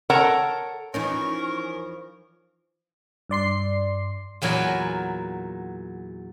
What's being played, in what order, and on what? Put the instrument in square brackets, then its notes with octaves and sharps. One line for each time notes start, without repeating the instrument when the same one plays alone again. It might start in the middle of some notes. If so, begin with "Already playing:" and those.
[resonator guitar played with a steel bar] A4 A#4 C#5 F#5 A5 A#5
[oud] E3 F3 D#4 [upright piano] C#4 [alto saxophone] A#4 [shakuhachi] C#6
[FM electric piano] G2 D5 C6 C7
[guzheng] E2 A#2 F#3 A#4 G#5 B5